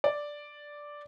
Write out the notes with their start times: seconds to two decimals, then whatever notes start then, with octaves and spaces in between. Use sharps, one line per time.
0.04 D5